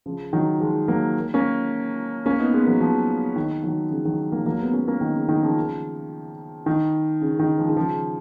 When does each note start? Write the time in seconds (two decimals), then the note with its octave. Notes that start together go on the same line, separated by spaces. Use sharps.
0.06 C#3 F3
0.33 D#3 F#3
0.60 F3 G#3
0.88 F#3 A#3
1.34 A#3 C#4
2.26 A#3 C#4
2.40 B3 D#4
2.54 G#3 B3
2.67 F#3 A#3
2.80 F3 G#3
3.36 D#3
3.64 D#3 F#3
3.91 C#3 F3
4.05 D#3 F#3
4.32 F#3 A#3
4.46 F#3 A#3
4.60 G#3 B3
4.73 A#3 C#4
4.87 A#3 C#4
5.01 D#3
5.15 C#3
5.29 D#3
5.42 C#3 F3
6.66 D#3
7.21 C#3
7.39 D#3
7.58 F3 G#3
7.70 D#3
7.77 C#3 F3